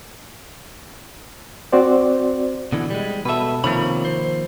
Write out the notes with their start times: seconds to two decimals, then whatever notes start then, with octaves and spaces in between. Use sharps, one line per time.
1.73 C4 F#4 C5 D5
2.72 B2 D3 E3
2.90 G3 G#3
3.25 B2 A4 B4 E5
3.64 C3 D#3 F3 A#3 C#5 B5
4.05 C5